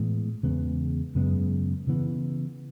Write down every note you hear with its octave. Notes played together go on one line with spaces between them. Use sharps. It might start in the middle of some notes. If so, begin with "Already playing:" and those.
Already playing: A2 E3 G#3 B3
E2 C#3 G#3 B3
F#2 C#3 G#3 B3
C#3 E3 B3